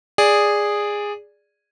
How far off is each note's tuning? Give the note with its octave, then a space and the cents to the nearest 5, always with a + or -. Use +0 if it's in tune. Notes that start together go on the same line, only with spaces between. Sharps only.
G#4 -10 D5 +0